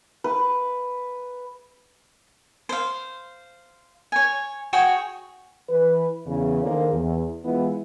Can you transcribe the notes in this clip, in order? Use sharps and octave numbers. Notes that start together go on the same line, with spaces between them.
B4
C5 F5
C#5 G#5
F#4 G#4 C#5 G5
E3 B4
E2 C#3
D3 D#3 A#3 G#4 C5
E2
E3 G#3 B3 E4 F4